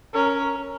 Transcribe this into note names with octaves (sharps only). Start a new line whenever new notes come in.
C#4 A#4